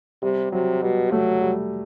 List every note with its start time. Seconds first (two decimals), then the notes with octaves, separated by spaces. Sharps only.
0.22 C3 G3
0.52 C3 F#3
0.82 B2 G3
1.12 F#3 A3
1.42 G3